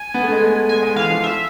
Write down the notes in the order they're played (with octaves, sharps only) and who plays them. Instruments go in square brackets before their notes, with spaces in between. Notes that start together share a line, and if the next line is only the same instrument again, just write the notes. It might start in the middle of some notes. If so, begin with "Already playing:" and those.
Already playing: [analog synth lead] G#5
[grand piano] B3
A3
G#3
A3
[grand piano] G#3 [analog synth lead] G#5
[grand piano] G#3
[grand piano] E3 [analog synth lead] F5
[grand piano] F3
[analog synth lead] E5